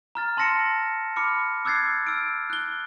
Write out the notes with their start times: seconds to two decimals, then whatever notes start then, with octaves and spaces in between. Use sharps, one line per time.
0.15 A#5 F6 A6
0.37 A5 C6 E6 A#6 C#7 E7
1.16 B5 D6 F6 C#7
1.65 D6 E6 F#6 G#6 A6 C7
2.07 E6 F6 D7
2.50 F#6 G7